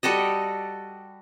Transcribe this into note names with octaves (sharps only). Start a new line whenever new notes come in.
G3 F#4 A4 D#5